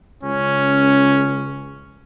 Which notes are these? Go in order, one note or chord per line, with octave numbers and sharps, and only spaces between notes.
C#2 C#4